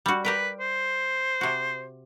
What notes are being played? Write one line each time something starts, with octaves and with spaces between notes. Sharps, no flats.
G3 F#4
G4 A#4 B4 G5
C5
C3 F#4